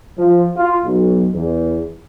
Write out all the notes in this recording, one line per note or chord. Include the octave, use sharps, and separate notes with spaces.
F3
F4
B1
E2